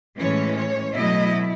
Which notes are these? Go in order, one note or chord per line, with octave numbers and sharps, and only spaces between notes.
A2 E3 G#3 C#4 C#5
C#5
B2 F#3 A3 E4 D#5